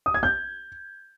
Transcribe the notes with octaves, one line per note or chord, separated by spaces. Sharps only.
D#6
G#6
G6